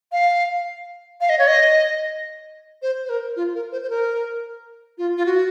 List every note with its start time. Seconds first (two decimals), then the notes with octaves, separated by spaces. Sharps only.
0.12 F5
1.21 F5
1.29 D#5
1.39 C#5
1.47 D#5
2.82 C5
3.05 C5
3.09 A#4
3.36 F4
3.55 A#4
3.72 C5
3.82 C5
3.90 A#4
4.98 F4
5.17 F4
5.26 F#4